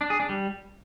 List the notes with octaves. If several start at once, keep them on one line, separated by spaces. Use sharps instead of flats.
D4
G#4
D4
G3